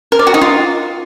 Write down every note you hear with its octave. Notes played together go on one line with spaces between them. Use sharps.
A#4
D5
F#4
D#4
F4